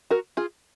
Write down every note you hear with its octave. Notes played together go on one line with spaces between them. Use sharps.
F#4 A#4
F4 G#4